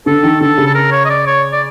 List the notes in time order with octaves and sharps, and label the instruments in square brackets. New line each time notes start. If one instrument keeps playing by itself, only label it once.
[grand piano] D3 [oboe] A4
[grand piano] D#3
[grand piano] D3 [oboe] A4
[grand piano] C#3
[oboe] A4
A#4
C#5
D#5
D5
C#5
D5